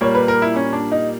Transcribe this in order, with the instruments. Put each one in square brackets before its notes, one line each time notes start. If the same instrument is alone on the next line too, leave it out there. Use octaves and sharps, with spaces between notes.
[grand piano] A#2 G3 A#3 [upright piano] C#5
[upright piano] B4
A#4
E4
C#4
D4
D#4